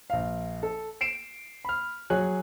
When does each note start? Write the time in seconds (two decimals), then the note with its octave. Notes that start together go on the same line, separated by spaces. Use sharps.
0.10 A#1 F5
0.63 A4
1.01 C7 D7 E7
1.65 B5 F6
2.10 F#3 G#4 C#5 G#5 F#6